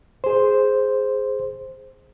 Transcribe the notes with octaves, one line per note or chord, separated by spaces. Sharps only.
G#4 C5